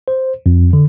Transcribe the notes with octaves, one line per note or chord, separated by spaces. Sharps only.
C5
F2
D3